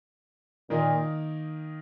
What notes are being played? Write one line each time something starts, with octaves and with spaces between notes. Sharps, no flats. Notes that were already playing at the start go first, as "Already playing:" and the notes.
A#2 D#3 A#3 D#4